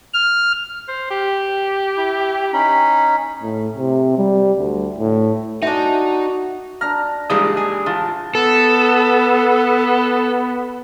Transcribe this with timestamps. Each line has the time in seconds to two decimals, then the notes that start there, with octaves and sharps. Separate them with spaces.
0.14 F6
0.88 C5
1.10 G4
1.97 E4
2.53 C#4 D#4 B5
3.43 A2
3.77 C3
4.17 G3
4.59 D2
4.99 A2
5.63 G#3 D4 D#4 F#4 E5
6.81 D4 A#5 F6
7.30 A#1 E3 F3 G3 G#3 D#4 D#6
7.57 G#4
7.86 E3 F4 A5
8.35 B3 A4